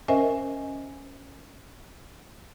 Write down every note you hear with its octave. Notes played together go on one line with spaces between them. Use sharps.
C#4 A#4 C5 D#5 E5 G#5